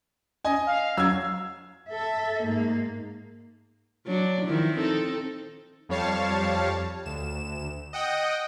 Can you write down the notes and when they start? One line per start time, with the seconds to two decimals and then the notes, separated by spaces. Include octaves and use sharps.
0.45 D#5 G#5
0.67 F5
0.97 F#3 E6 G#6
1.89 A4 E5
2.43 G#2 A#3
4.06 F#3 D4
4.46 D#3 F3 E4
4.76 C4 D#4 A4
5.89 F2 G3 C#5 F5 A5
7.06 D2 E7
7.93 D#5 F#5 G5 D#6